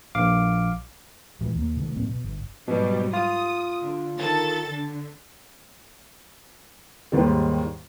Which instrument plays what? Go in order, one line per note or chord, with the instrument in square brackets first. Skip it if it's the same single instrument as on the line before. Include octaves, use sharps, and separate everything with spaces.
[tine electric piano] A#1 F5 D6
[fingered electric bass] A#2 E3 G#3
D#2 A#3
C3 D#3 A3
A2 F#3 A#3 C4
B2
G1
[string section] G#2 F#3 G3 [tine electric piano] B2
[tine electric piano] F4 [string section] D#6
[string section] D3
D#3 A4 A6
D3
[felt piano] D#2 G#2 D#3 G3